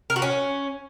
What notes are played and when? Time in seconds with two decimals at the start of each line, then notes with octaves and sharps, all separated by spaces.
0.10 A#4
0.16 F#4
0.22 C#4